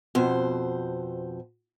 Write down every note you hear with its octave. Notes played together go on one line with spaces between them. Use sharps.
F2 B2 C5